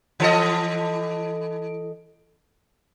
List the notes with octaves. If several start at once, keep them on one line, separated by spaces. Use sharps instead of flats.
E3 A4 D#5